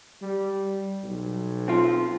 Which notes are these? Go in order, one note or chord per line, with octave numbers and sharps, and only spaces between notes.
G3
B1
C4 F4